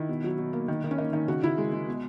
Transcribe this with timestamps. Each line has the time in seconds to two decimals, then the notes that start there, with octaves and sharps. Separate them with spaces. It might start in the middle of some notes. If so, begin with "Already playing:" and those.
Already playing: D#3 E4
0.09 B2
0.24 F#3
0.38 B2
0.53 A#3
0.68 D#3
0.84 D#3
0.91 C#4
0.98 A#3 D#4
1.13 D#3 D#4
1.28 C#3 F#4
1.43 C#3 E4
1.58 G#3 G#4
1.73 G#3
1.88 B2